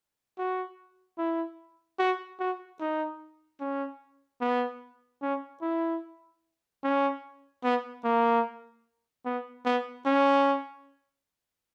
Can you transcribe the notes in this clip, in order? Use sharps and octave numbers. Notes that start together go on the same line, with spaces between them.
F#4
E4
F#4
F#4
D#4
C#4
B3
C#4
E4
C#4
B3
A#3
B3
B3
C#4